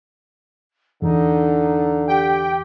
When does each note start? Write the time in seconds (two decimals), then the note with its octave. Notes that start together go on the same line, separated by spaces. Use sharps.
1.02 E2 D3 D#4
2.07 G4 G5